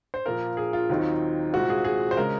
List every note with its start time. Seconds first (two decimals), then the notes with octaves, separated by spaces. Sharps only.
0.14 C5
0.26 A#2 F3 A#3 F4 A#4
0.57 G#4
0.73 F4
0.89 D#2 D#3 F#3 C4 D#4
1.53 C2 A#2 G#3 C4 F4 F#4
1.70 G#4
1.84 G#4
2.11 C5
2.17 C#3 G#3 A#4